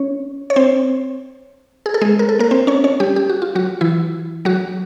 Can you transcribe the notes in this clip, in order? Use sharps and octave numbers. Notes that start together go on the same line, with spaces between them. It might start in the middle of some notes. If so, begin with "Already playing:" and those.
Already playing: C#4 C#5
C#5
C4 C5
G#4
A4
G#3 G#4
A#4
A4
A#3 A#4
C4 C5
C#4 C#5
C#4 C#5
G3 G4
G4
F#4
F4
F#3 F#4
E3 E4
F#3 F#4